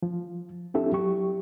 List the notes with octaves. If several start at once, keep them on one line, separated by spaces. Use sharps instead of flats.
F3
C4 D4 E4 G4 A4 E5
F#3 G4 C#6